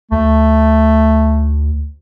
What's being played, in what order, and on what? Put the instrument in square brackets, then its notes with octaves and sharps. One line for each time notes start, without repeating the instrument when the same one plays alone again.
[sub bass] D2 [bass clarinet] A3